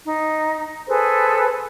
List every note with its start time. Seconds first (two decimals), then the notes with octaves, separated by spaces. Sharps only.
0.06 D#4
0.88 G#4 A4 B4 C5